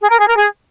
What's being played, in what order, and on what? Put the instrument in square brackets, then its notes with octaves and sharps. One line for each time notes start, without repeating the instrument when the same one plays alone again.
[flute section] G#4
A#4
G#4
A#4
G#4